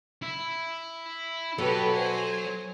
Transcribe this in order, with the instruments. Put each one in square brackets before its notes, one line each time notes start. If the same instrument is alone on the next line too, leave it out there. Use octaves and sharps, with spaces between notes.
[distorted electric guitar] E4
[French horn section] B2 F#4 [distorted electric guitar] F#3 [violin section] B3 G4 B4 [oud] A4
[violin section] C5 G#5